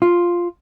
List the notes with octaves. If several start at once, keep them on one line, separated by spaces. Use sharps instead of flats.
F4